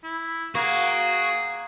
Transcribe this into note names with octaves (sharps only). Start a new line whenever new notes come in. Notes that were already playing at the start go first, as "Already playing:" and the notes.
E4
A#3 F#4 G#4